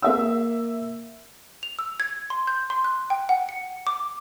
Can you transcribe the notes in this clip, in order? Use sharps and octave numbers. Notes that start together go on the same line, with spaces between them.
A#3 E5 E6
F7
E6
G#6
C6
G6
C6
F#6
G5
F#5
C#7
D6